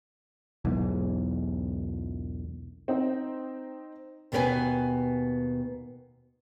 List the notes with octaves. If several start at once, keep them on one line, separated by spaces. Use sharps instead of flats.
B1 E2 G#2
C4 D#4
D#2 B2 B3 A#4 B4 G#5